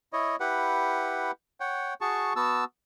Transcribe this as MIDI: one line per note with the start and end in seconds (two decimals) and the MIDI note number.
0.13 0.36 64
0.13 0.36 73
0.13 0.36 75
0.40 1.31 64
0.40 1.31 67
0.40 1.31 71
0.40 1.31 78
1.60 1.94 73
1.60 1.94 78
1.60 1.94 79
2.01 2.33 66
2.01 2.33 68
2.01 2.33 81
2.01 2.33 85
2.36 2.64 59
2.36 2.64 66
2.36 2.64 81
2.36 2.64 88